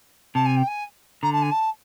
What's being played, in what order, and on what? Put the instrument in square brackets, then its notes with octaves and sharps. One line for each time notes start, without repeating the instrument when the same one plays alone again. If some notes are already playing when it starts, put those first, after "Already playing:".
[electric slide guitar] C3 [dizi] A5
[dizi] G#5
G5
G#5
[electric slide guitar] D3 [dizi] A#5
[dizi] A5
G#5
A5